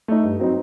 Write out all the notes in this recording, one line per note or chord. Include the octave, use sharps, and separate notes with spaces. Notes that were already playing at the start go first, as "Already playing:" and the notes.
A3 D#4
G2
F#3 C4 D#4